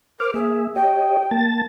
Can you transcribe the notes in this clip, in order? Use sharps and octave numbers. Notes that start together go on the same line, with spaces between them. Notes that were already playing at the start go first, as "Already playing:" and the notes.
A#4 C5 D6 F6
A#3 G#4 E5
G4 C#5 D#5 G5
A#3 A5 A6